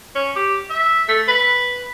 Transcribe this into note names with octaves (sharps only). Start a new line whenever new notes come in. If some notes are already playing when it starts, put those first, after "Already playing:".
C#4
G4
E5
A3
B4